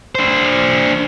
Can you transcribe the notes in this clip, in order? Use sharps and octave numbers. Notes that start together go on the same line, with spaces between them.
D4 C5